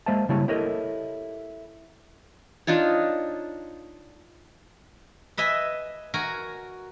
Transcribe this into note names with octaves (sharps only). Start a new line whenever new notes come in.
G#3 A#3 C5 E5 F5 A5
C#3 G3 A#3 E4 C#5 A5
E4 G4 A4 A#4 C#5 D#5
D4 D#4 F4 C#5
B4 D#5 E5 G#5
F#4 A#4 G#5